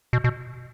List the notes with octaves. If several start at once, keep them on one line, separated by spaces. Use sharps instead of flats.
B2
B2